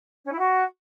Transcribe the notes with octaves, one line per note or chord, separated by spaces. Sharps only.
C#4
E4
F#4